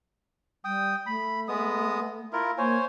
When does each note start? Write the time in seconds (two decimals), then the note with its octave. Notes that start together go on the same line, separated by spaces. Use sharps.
0.65 G3 G5 D#6
1.06 A3 B5
1.48 G#3 B3 D#6
2.33 E4 F4 A#4
2.58 A#3 C5 C#5 G#5